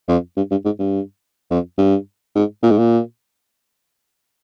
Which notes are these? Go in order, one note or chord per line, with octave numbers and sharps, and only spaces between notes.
F2
G2
G2
G#2
G2
F2
G2
G#2
A#2
G#2
A#2